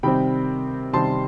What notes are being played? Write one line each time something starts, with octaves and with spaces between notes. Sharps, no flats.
C3 D#3 G3 C4 G5 B5
C3 D#3 G3 C4 A5 C6